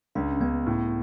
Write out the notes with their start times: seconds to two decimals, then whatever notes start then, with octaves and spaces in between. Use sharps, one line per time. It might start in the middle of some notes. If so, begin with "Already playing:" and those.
0.15 C#2 D4
0.33 C#4
0.40 C#2 B3
0.66 A2